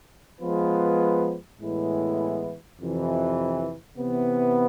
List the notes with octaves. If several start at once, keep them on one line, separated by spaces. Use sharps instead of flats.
F3 G#3 B3 F4 B4
A2 E3 G#3 B3 E4
F2 C3 E3
C3 E3 B3